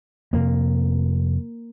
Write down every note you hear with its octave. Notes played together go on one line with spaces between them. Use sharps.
F2 C3 A#3